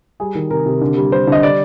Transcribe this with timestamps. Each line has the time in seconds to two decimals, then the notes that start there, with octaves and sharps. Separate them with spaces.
0.20 G3 G#4
0.35 D#3
0.50 C3 A#4
0.66 C3
0.81 D3
0.97 G3
1.12 G3 C5
1.27 D3 D#5
1.43 G3 D5